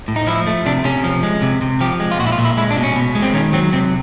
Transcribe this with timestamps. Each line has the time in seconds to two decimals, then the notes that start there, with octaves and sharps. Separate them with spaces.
0.08 A2
0.16 D#4
0.27 F3 E4
0.47 A3
0.66 C3 D4
0.84 C3 C#4
1.04 F3
1.23 G#3
1.42 C3
1.62 C3
1.81 F3 G4
2.00 G#3
2.11 F4
2.19 A#2 F#4
2.27 E4
2.32 F4
2.38 A#2
2.45 E4
2.57 G#3 E4
2.71 D4
2.77 B2
2.83 C#4
2.96 B2
3.15 G#3
3.22 C4
3.34 D#3 C#4
3.53 F#3 C4
3.73 C3 C4